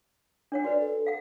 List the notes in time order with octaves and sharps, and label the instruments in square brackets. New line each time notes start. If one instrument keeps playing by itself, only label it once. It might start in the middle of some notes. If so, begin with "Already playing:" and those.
[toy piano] D4 C#5 F#5
[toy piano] F#4 B4 [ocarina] D5
[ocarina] A4
[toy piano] F5 F#5